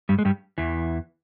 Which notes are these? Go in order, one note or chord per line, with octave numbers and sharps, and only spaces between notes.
G2 G3
G#3
G2 G3
E2 E3